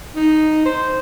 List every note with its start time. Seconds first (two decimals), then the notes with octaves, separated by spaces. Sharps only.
0.16 D#4
0.65 C5